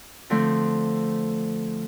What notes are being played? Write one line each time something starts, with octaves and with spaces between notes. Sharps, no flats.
D3 F3 A3 C4 D4